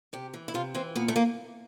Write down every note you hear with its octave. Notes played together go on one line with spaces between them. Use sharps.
C3 G4
E3
E4
C3 F4
E3 C4
A#2 B3
A3
A#3